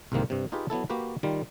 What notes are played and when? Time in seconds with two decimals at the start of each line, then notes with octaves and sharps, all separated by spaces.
0.12 C2 G#2 C3 D#3 A#3 C5
0.30 G2 C3
0.52 D#4 F4 G4 G#4 B4
0.70 F#3 B3 E4 A4
0.90 A#3 F#4 G4 B4
1.23 D#3 G3 F4